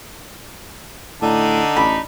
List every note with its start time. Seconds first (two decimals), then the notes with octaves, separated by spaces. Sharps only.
1.22 A2 D3 D4 D#4
1.77 A1 B5